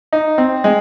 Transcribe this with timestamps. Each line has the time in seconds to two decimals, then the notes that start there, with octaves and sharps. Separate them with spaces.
0.13 D#4
0.38 C4
0.64 G#3